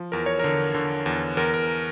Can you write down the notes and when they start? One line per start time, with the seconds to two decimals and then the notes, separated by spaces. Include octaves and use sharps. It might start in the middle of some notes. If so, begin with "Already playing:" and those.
Already playing: F3
0.12 E2 A#4
0.26 C#5
0.39 D3 A#4
0.74 D3
1.06 E2
1.37 E2 A#4
1.54 A#4